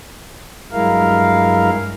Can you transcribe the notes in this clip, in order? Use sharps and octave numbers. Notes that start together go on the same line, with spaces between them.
G2 F#3 G#3 E4 A#4 F5